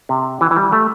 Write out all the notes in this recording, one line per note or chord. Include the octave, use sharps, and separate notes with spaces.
C3
E3
E3
G3
A3